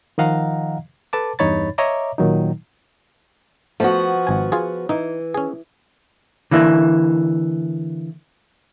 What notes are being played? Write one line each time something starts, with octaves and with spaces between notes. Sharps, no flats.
D#3 F3 D#5 F5 F#5 A#5
A4 B4 A5 D6
E2 G2 D#4 C#5 B5 A6
C#5 D#5 E5 A#5 D6
A#2 D#3 F#3 D#4
F3 A3 B3 F#4
G#1 G#5
F4 G#4
E3 D#4
C#4 G#4
D3 E3 A#3 E4